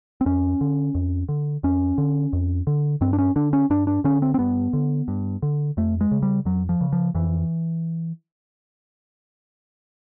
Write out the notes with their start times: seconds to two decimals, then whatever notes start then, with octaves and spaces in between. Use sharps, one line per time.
0.21 C4
0.26 F2 C#4
0.61 D3
0.95 F2
1.29 D3
1.63 F2 C#4
1.98 D3
2.33 F2
2.67 D3
3.01 G2 C4
3.13 D4
3.18 C#4
3.36 D3 D4
3.53 C#4
3.70 G2 D4
3.87 D4
4.04 D3 C#4
4.22 C4
4.34 C4
4.39 G2 B3
4.73 D3
5.08 G2
5.42 D3
5.77 F2 A3
6.01 G#3
6.11 C#3
6.22 G3
6.45 F2 F#3
6.69 F3
6.81 C#3
6.93 F3
7.15 F2 E3